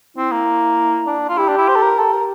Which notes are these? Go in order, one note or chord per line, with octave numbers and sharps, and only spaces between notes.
C4 E4
A#3
D4
F4
E4 G4
D4
E4
C5
A4
A#4
G4 A4
A#4